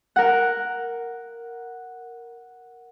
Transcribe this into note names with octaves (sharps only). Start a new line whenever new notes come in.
A#4 F#5